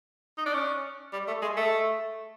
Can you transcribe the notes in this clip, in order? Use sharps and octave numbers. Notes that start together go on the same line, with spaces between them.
D#4
D4
C#4
G3
A3
G#3
A3